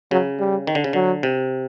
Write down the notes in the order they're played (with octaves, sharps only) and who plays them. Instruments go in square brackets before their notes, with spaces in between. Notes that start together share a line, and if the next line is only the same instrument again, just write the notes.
[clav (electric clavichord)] C#3 [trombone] F#3
[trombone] G3
[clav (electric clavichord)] D#3
D3
C#3
[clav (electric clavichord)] D3 [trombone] F#3
[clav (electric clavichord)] C3